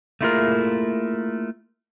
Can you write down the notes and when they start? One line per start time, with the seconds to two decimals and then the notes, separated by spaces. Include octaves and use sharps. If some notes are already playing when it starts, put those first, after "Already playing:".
0.21 A3 A#3 E4 F4 G#4 A#4